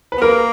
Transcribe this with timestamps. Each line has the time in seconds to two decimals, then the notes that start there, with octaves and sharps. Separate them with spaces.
0.12 B4
0.18 B3
0.22 A#3 A#4